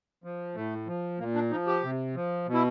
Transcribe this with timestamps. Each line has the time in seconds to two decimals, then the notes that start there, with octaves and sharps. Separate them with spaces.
0.24 F3
0.55 A2 A3
0.87 F3
1.19 A#2 A#3
1.35 D4
1.51 F3 D#4
1.67 G4
1.83 C3
2.15 F3
2.47 B2
2.54 E4